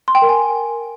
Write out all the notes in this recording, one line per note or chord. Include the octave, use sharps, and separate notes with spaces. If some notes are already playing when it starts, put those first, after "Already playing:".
C6
G5
A#4
G#5